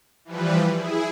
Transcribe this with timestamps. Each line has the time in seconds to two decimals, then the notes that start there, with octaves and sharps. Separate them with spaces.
0.25 E3 F3 G3 B4
0.74 E4 G#4